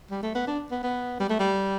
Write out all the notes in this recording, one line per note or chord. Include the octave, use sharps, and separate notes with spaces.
G3
A3
B3
D4
B3
B3
G3
A3
G3